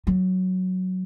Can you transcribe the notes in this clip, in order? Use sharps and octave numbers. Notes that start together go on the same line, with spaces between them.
F#3